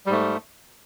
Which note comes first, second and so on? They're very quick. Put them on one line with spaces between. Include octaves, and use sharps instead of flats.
G3 G#2 A3